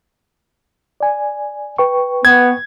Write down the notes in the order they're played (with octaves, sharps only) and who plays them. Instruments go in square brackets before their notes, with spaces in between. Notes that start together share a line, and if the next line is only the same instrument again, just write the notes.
[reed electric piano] D5 G#5
B4 G5 C#6
[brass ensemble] B3 [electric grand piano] G#6